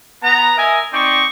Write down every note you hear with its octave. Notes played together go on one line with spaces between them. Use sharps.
B3 A#5
A#4 D#5 E5 G#5
C4 D#4 D5 C#6